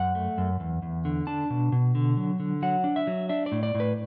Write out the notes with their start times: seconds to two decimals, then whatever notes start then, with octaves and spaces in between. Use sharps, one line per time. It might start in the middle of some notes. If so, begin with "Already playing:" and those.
Already playing: F#2 F#5
0.15 A3
0.38 F#2
0.60 E2
0.82 E2
1.05 D3
1.27 D4 A5
1.50 B2
1.72 B2
1.95 D3
2.17 F#3
2.40 D3
2.62 F#3 F#5
2.84 D4
2.96 E5
3.07 F#3
3.29 D4 E5
3.46 D5
3.52 A2
3.63 D5
3.75 A2
3.80 B4